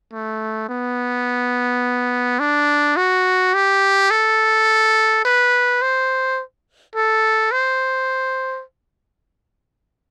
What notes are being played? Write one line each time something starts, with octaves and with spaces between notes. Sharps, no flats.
A3
B3
D4
F#4
G4
A4
B4
C5
A4
C5